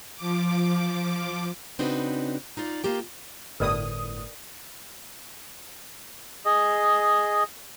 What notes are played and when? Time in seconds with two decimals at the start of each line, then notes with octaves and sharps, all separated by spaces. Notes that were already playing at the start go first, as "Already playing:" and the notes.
0.15 F3 D6
1.79 C#3 C4 D4 D#4 F#4 B4
2.57 D#4 F4 D5
2.84 A#3 F4 G4 G5
3.60 G1 A2 A#4 B4 D5 D#6
6.45 G#4 D#5